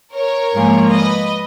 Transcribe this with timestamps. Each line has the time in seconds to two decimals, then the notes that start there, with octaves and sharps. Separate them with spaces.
0.14 A#4 C#5
0.53 G#2 F3 A#3 F4 G#4
0.92 B4 D#5